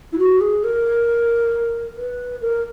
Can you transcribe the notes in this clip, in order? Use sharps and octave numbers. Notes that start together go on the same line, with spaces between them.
E4
F#4
G#4
A#4
B4
A#4